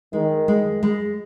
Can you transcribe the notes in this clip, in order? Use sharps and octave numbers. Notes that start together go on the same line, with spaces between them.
D#3 G#3
G#3
G#3